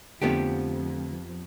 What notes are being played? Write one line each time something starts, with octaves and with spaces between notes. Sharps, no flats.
F2 D3 F3 A3 B3 C4 G4